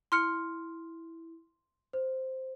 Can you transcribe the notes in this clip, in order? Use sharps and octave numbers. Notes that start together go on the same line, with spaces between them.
E4 C6 F6 C#7
C5